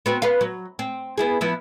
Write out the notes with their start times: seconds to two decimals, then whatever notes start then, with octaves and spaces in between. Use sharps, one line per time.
0.06 B3 C4 F#4
0.22 B3 B4 F5
0.41 F#3
0.79 C4
1.18 B3 E4 G#4
1.41 F3 B3 E4